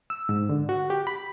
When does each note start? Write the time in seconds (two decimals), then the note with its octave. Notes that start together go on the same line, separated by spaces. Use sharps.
0.10 E6
0.29 G#2
0.49 D3
0.69 F#4
0.90 G4
1.07 B5